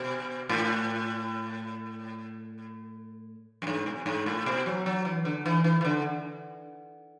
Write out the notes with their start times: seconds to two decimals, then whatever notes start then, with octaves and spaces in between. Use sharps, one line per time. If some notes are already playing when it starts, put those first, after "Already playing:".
Already playing: B2
0.49 A2
3.62 F#2
3.67 G#2
3.86 B2
4.06 G#2
4.26 A2
4.46 B2
4.66 F#3
4.86 F#3
5.05 E3
5.25 D3
5.46 E3
5.64 E3
5.81 E3
5.85 D3